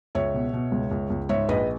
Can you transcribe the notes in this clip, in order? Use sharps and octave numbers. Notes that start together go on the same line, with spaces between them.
C#2 C#5 E5
B2
B2
C#2
C#2
C#2
G#2 C#5 E5
A#1 B4 D#5